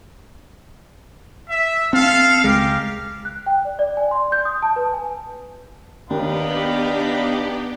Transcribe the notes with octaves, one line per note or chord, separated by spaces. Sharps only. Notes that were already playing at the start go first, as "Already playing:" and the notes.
E5
C4 A4 F5
C#2 G#3 G4 A#4 F5
F#6
G5
D5
D5
G#5
C6
G6
D#6
A5
B4
G#5
D#2 B3 D4 D#4 G4 F5 B5